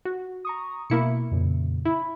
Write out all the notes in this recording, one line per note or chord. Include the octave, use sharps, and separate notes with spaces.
F#4
A#5 C#6 D#6
B2 A#3 E4 C#7
F2 A#2 C#3
E4 B5